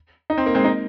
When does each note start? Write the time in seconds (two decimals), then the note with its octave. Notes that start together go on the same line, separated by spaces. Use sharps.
0.30 D#4
0.38 C4
0.46 A#3
0.55 G#3 C4
0.64 A#3 D#4